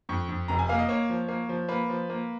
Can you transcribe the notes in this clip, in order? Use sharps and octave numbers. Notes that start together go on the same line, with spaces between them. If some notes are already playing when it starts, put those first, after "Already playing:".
F2 C#6
F2
F1 A#5
G#5
A#3 F5
D#5
A#3 C#5
F3
A#3
F3
A#3 B4
F3
A#3